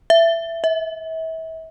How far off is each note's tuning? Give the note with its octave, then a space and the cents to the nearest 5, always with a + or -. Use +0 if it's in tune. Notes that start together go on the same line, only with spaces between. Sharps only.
E5 +15
E5 -35